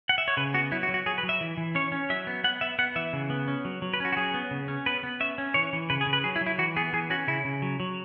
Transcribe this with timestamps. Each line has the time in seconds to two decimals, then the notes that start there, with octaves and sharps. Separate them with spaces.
0.09 F#5
0.18 E5
0.28 C#5
0.37 C#3 B4
0.54 B3 F#4
0.71 F#3 E4
0.83 F#4
0.89 F#3
0.94 F#4
1.06 F#3 G#4
1.18 B4
1.23 F#3
1.29 E5
1.41 E3
1.57 E3
1.75 C#4 C#5
1.92 C#4
2.10 F#3 E5
2.27 B3
2.44 B3 F#5
2.61 B3 E5
2.79 B3 F#5
2.96 E3 E5
3.13 C#3
3.30 B3
3.48 C#4
3.65 F#3
3.82 F#3
3.94 B4
4.00 C#4 F#4
4.12 F#4
4.17 F#3 G#4
4.34 B3
4.51 C#3
4.68 C#4
4.86 B3 B4
5.03 B3
5.20 C#4 E5
5.38 C#4
5.54 E3 C#5
5.73 E3
5.90 C#3 B4
6.01 G#4
6.07 C#3
6.13 B4
6.24 F#3 G#4
6.36 E4
6.41 F#3
6.46 E4
6.58 E3 F#4
6.76 B3 G#4
6.93 E3 G#4
7.10 C#4 F#4
7.27 C#3 E4
7.45 C#3
7.62 F#3
7.80 F#3